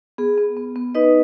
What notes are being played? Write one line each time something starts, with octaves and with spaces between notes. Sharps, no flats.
B3 G#4
B3
B3
B3
D#4 B4 D#5